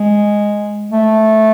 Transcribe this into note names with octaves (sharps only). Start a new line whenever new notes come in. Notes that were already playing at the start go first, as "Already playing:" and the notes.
Already playing: G#3
A3